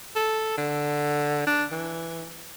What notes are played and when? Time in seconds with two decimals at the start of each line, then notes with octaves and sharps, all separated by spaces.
0.16 A4
0.58 D3
1.47 D4
1.72 E3